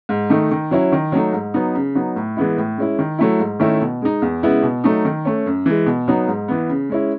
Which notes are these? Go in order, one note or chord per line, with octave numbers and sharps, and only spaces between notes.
G#2
D#3 A3 D#4
D#3
F#3 C#4 E4
D#3
F#3 A3 D#4
G#2
F#3 B3 D#4
C#3
F#3 B3 D#4
A2
E3 G#3 B3 E4
A2
G#3 C#4 E4
D#3
F#3 A3 E4
G#2
D#3 A3 C#4 E4
B2
G#3 D#4
E2
C#3 G#3 B3 E4
B2
F#3 A3 D#4
D#3
A3 C#4
F#2
E3 G#3
B2
F#3 B3 D#4
G#2
E3 B3
C#3
G#3 C#4 E4